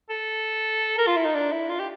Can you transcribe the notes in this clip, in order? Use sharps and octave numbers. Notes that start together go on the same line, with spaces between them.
A4
A#4
F4
E4
D#4
D4
E4
F4
G4